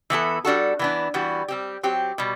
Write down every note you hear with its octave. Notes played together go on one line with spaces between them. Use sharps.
E3 B3 E4 A4
G3 D4 F#4 A4
E3 B3 D4
E3 G3 B3 F#4
G3 C4 G4
F#3 C4 G4
B2 G3